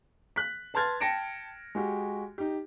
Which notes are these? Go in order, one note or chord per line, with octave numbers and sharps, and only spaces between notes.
F#6 B6
B4 A5 C6 F6 G#6 A6
G5 A5 A#6 C#7 D7 E7
G#3 F#4 G4
D#4 G4